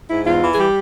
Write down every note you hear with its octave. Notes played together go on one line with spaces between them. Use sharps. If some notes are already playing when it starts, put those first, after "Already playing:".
G#2 E4
E2 F4
E3
G#4
G3 G4